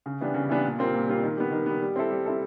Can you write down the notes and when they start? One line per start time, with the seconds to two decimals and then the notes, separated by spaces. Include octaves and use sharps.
0.06 C#3
0.21 E3 G3 B3 D4
0.34 C#3
0.49 E3 G3 B3 D4
0.64 A#2
0.79 G3 C4 F4 A#4
0.94 A#2
1.08 G3 C4 F4 A#4
1.23 D#3
1.37 G3 B3
1.51 D#3
1.66 G3 B3
1.81 G3
1.96 C4 E4 A4
2.11 G3
2.26 C4 E4 A4